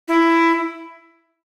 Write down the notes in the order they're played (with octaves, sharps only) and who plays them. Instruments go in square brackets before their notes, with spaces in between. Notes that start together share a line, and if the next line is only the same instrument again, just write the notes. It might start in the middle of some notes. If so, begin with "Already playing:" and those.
[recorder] E4